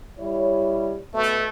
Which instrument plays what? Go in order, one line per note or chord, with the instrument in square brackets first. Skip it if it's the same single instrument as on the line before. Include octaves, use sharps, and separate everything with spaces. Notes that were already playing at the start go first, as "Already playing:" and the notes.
[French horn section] G3 E4 C#5
[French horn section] B2 B4 [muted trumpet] A3